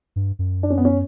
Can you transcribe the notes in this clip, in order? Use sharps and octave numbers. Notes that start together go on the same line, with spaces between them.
G2
F#2
D4
C#4
B3
C#4